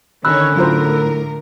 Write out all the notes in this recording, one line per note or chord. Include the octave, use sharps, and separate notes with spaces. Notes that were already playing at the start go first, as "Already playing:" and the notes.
D3 D#3 C#4 C#5 B5 E6 F#6
A2 F#3 F4 A#4 C5